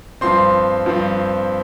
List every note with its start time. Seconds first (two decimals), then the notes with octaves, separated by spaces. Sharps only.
0.21 G2 F3 C4 C6
0.86 G2 F3 C4